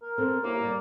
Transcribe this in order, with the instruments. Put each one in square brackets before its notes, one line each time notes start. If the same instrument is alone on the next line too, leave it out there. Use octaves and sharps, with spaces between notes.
[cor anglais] A#4
[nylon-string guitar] C4 A4
[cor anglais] A#3 [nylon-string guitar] E4 G4 C#5
[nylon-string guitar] G3 D5